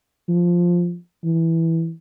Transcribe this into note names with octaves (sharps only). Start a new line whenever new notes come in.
F3
E3